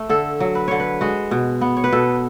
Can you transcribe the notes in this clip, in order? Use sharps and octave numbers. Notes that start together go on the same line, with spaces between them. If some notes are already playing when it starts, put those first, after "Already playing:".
Already playing: A3
D3 A4
F#3
B4
D3 C#5
B4
G#3 F#4
B2
B3
C#5
B4
B2 A4